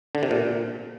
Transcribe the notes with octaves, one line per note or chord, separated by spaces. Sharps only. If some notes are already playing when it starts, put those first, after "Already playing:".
D3
C3
A#2